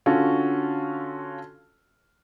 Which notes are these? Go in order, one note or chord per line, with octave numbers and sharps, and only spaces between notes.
D3 C#4 F4 F#4 A4